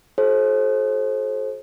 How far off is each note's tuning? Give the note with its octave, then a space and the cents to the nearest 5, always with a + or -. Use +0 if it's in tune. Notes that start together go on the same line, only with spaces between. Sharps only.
F#4 +0 A4 -40 C5 +30